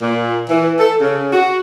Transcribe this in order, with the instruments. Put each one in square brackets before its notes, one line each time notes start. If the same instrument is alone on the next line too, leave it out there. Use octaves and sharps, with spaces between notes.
[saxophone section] A#2
E3
A4
C#3
F#4